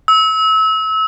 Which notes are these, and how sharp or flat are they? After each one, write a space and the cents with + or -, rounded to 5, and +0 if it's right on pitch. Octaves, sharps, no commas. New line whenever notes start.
E6 -30